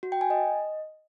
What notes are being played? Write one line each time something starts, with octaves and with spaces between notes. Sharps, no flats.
F#4
G5
G#5
D#5